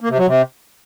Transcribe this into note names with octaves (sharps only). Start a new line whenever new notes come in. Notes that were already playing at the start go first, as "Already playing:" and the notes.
A#3
C3
F#3
C3